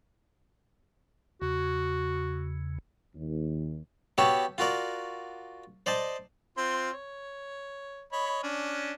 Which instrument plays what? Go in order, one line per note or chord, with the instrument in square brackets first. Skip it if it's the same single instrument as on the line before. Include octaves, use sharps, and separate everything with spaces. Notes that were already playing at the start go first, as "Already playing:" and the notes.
[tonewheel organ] E2 C#3 [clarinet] F#4
[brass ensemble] D#2
[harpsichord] B3 F#4 G4 C#5 E5 A5
F4 F#4 A#4 D5
C5 D5 D#5 A5
[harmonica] C4 F4 C6
C#5
C#5 D#5 B5
C#4 D4